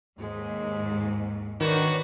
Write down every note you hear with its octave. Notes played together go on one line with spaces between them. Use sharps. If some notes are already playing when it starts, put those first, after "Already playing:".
D#2 G#2 G#3
D#3 D4 F#4 B4 C#5